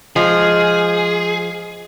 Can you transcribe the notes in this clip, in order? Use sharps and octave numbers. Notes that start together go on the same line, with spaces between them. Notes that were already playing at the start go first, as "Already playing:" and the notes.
F3 G#3 G#4